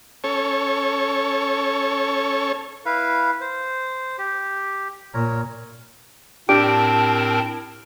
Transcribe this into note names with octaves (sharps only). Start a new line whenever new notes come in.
C#4 A4 C#5
E4 B4 F5
C5
G4
A#2 A#4 C#5 A#5
A2 C4 D4 G4 A#4 A5 D7